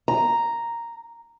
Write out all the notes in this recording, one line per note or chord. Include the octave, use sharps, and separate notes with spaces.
A#5